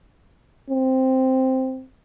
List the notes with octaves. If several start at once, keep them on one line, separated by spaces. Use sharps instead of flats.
C4